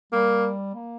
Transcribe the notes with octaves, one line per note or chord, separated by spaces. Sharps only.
G3 A#3
A#3